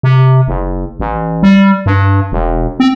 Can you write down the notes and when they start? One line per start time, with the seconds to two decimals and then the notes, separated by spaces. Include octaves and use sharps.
0.03 C3
0.48 F#1
1.00 A1
1.43 G3
1.86 G2
2.32 E1
2.80 C4